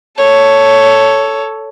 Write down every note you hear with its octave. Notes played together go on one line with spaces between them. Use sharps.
A4 C#5